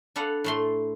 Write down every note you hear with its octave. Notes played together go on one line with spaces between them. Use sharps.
D4 A4 B4 F5 F#5
A2 A3 C6